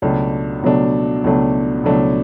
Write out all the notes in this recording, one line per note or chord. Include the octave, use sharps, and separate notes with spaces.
C#2 B2 F#3 A3 D4
C#2 B2 F#3 A3 D4
C#2 B2 F#3 A3 D4
C#2 B2 F#3 A3 D4